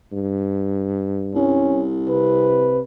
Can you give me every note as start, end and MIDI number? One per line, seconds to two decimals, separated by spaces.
0.12 1.72 43
1.35 2.77 36
1.35 1.84 61
2.09 2.81 48
2.09 2.82 71